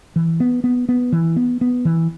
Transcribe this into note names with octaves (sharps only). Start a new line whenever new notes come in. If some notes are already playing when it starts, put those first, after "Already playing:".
E3
B3
B3
B3
E3
B3
B3
E3